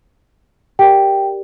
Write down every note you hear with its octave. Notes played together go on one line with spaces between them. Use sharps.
G4 A#4 D5 G5